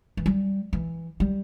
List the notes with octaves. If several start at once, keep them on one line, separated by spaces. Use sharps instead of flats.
E3
G3
E3
G3